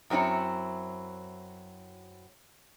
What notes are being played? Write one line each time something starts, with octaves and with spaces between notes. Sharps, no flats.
F#2 F#3 C4 E4 C#5